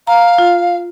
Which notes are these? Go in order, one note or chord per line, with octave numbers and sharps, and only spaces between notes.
F5 A#5
F4